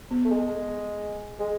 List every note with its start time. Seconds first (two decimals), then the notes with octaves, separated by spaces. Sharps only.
0.11 B3
0.25 A3
0.31 G#3
1.40 G#3